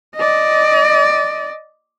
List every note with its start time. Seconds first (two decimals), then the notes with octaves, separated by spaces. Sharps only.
0.16 D5 D#5